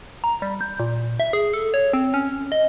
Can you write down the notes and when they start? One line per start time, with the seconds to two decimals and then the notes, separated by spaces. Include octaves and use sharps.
0.24 A#5
0.42 G3
0.61 G6
0.79 A#2
1.20 E5
1.33 G#4
1.53 A4
1.74 C#5
1.93 C4
2.14 C#4
2.52 D#5